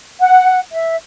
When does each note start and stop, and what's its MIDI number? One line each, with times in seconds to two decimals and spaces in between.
0.20 0.59 78
0.73 0.94 76